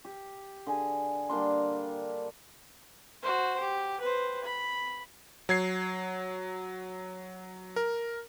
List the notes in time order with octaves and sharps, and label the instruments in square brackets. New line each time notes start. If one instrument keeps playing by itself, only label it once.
[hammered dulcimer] G4
D3 G#4 G#5
G3 A#3 D4 C6
[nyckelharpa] F#4 C5
G4
B4 C5
B5
[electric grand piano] F#3 G#6 C7
A#4